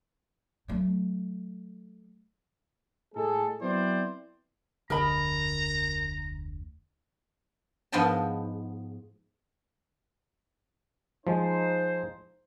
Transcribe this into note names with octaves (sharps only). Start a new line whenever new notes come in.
F#3 A3
A2 G#3 G#4 A4
F#3 B3 C4 E4 C5 D5
F1 D2 D3 A#4 D#5 A#5 B5
G#2 F3 B3 D#5 G5 A5
F3 G#3 D#4 C5